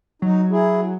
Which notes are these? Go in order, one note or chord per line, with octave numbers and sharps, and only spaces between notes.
F#3 D#4
E4 G#4